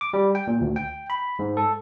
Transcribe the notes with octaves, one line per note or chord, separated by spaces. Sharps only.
D6
G3
G5
A#2
D2
G5
B5
G#2
A4